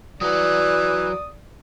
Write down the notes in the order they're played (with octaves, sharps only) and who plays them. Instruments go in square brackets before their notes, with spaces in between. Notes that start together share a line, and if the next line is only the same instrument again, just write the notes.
[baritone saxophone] E3 [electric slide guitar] F#3 F#4 A#5 [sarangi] D5 [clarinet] D#6